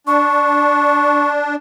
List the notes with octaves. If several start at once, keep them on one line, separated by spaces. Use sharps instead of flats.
D4 C#6